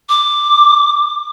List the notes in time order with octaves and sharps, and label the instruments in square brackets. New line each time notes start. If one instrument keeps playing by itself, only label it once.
[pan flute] D6